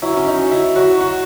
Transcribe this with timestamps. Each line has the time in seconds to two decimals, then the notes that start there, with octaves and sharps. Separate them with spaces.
0.02 F#3 E4
0.17 C#4
0.26 D#4
0.38 F#3
0.51 E4
0.76 F#3 F#4
1.00 F#4